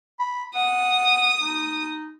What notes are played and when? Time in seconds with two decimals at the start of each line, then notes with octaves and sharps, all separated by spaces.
0.19 B5
0.55 F#5 D#6
1.41 D#4